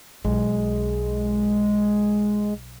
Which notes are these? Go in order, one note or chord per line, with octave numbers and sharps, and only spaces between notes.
B1 G#3